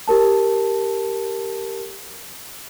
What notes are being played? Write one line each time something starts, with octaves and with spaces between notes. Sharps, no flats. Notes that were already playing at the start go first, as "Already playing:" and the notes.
G4 A#4 A5